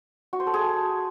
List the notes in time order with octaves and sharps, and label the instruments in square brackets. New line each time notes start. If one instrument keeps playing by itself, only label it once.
[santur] F#4
C5
A4
G#4